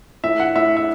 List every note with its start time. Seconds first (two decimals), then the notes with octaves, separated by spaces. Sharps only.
0.23 A2 E5
0.40 F#5
0.55 A2 E5
0.77 E5